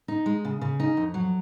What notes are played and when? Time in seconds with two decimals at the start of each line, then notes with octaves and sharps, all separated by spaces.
0.08 D#4
0.26 G#3
0.45 C#3
0.61 C#3
0.80 D#4
0.97 F2
1.14 F#3